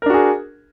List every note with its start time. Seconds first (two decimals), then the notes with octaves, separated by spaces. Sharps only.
0.02 A#4
0.06 D4
0.10 F#4
0.14 G#4